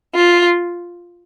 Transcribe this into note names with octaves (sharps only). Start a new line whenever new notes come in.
F4